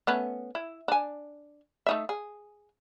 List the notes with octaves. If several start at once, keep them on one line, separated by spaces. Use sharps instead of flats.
A3 B3 C#4
E4
D4 G#5
A3 D#4 E5
G#4